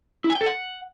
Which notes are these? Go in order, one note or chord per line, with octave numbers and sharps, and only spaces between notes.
E4
G#5
G5
A4
F#5